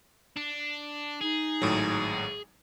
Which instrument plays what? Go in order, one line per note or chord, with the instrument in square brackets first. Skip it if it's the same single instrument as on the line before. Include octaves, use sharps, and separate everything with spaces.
[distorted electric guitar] D4
[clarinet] D#4 [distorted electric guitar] G#4
[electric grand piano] G#1 A2 F#3